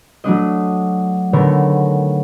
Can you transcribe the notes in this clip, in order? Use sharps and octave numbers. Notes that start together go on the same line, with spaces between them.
F#3 A3 D4 D#5
D3 D#3 A3 B3 A#4 C#5